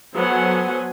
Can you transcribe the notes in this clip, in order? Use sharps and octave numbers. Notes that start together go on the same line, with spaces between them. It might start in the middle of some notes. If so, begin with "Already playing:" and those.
F#3 B3 A4 C5 F#5 G#5